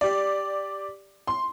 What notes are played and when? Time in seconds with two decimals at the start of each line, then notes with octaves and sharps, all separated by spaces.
0.01 G4 D5
1.27 C6